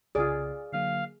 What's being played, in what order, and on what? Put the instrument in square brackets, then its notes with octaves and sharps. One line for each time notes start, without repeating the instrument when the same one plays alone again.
[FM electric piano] C2 C#3 [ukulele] F4 D5 [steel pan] G#4
[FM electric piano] D3 F#3 A#3 [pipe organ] F5